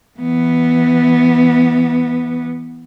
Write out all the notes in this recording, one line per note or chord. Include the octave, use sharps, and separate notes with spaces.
E3 B3